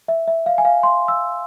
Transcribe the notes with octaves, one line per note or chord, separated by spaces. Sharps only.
E5
E5
F5
G#5
F5
C6
E6